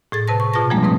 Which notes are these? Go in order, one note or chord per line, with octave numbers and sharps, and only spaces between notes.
A2 G#4 A6
C3 B4 A5 A#6
C#6
B2 F4 G#4 A5 A#6
F3 G3 G#3 A#3 D4
G#2 A3 C4 B4 D#6